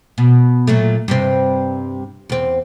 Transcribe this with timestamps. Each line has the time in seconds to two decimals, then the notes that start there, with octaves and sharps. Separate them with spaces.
0.18 B2
0.67 A#2 F#3 A3
1.08 G2 C3 C4
2.29 E2 C4